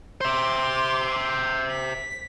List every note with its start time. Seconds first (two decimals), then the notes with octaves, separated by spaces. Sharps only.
0.21 C5 E5 C6 D6
1.71 B6